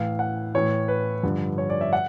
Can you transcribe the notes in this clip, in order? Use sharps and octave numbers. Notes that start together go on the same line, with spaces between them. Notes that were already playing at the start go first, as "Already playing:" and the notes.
Already playing: A2 E3 F5
F#5
A2 E3 C#5
B4
G2 D3 F3
C#5
D5
E5
F#5